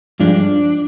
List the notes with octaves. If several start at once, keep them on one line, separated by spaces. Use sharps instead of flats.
G2 F3 G#3 D4
D4